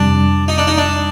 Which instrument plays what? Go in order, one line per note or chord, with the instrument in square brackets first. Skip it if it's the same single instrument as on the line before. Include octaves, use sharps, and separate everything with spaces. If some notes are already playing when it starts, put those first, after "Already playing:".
Already playing: [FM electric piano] F2 C3 G3 [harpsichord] D4
[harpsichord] D#4
D4
D#4
D4